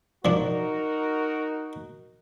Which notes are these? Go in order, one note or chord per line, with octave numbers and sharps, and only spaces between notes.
F3 D4 D#4 F#4 A#4